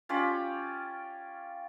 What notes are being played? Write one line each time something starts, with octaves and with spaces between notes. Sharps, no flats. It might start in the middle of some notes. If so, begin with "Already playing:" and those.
C#4 F4 G4 D5